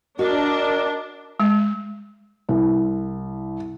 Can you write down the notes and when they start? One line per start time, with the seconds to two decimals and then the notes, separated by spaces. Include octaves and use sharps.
0.19 D4 F#4 A#4 D#5
1.40 G#3
2.49 C2